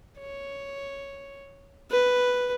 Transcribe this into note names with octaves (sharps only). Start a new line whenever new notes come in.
C#5
B4